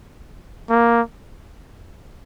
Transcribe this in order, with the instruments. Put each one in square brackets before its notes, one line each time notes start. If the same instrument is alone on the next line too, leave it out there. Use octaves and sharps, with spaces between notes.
[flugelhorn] A#3